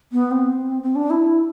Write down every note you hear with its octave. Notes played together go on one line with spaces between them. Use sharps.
B3
C4
C4
D4
E4